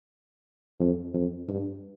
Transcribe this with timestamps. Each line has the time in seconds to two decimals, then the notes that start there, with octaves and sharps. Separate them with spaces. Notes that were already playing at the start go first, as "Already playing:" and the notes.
0.80 F2
1.14 F2
1.48 G2